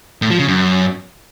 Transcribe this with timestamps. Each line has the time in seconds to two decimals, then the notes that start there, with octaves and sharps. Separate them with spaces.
0.22 A2
0.31 F3
0.39 C#3
0.48 F#2